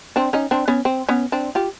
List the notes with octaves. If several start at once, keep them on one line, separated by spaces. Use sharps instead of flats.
C4 D4
C#4 D#4
C4 D4
B3 C#4
C4
B3 C#4
C4 D4
F4 G4